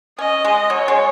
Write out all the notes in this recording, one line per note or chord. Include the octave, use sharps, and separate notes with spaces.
C#4 D#5
G#3
F#3 C#5
G#3